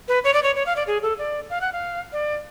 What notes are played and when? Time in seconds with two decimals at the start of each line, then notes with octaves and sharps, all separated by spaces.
0.08 B4
0.24 C#5
0.34 D5
0.43 C#5
0.56 C#5
0.66 F5
0.76 D5
0.87 G#4
1.03 A4
1.18 D5
1.50 F5
1.61 F#5
1.73 F5
2.13 D5